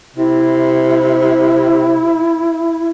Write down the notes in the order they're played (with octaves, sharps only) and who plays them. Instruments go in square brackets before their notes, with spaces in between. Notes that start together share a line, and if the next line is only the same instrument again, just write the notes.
[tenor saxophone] C3 [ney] E4